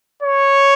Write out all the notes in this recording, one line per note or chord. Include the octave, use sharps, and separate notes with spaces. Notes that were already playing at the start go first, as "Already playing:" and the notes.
C#5